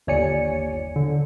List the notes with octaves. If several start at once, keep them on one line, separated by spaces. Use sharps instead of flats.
G1 D#2 C#5 D5 G#5 C#7
D3